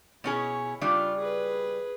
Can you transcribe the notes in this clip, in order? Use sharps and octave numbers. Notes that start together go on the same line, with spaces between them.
B2 C#4 E4 G#4 C#5
C#3 G3 D4 F4
G#4 B4